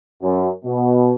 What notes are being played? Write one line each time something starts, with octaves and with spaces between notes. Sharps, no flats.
F#2
B2